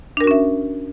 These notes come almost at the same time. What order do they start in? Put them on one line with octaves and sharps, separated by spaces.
D4 A#4 F#4 C#4 E5